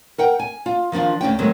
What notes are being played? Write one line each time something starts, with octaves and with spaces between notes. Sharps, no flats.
A#4 F#5 G5
G#5
F4
D#3 F3 D4 F4
D2 G2 C#4 G5
D#3 F#3 G#3 A3 C4